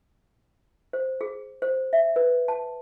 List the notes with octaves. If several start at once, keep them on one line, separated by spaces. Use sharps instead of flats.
C5
G#4
C5
E5
B4
A5